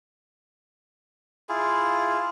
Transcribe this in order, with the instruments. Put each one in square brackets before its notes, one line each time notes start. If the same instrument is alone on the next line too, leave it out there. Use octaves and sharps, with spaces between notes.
[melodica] E4 F4 G#4